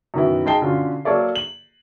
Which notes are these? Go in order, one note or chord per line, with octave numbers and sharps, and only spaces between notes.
F#2 B2 D#3 B3 E4
G#3 D#4 G5 A5 C7 G7
B2 D3 C#4 F4
F#3 A#3 A4 C#5 D5 E5
F#7